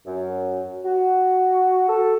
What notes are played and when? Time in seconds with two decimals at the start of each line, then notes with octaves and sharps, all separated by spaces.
0.06 F#2
0.85 F#4
1.89 A4